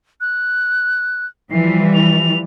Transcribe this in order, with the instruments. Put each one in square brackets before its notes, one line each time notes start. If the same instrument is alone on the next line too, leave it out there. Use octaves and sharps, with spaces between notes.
[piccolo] F#6
[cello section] E3 F3 G3 [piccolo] C7
[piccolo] F7